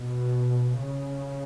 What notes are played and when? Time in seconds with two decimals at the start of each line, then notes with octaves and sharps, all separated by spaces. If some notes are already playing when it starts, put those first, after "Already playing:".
Already playing: B2
0.80 C#3